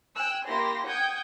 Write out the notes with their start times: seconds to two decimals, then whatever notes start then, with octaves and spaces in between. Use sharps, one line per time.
0.15 G5 G#5 E6 F#6
0.46 A#3 E4 G4 C6 A#6
0.87 F#5 G5 D#6 G6 G#6